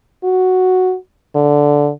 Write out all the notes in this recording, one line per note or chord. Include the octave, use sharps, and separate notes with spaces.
F#4
D3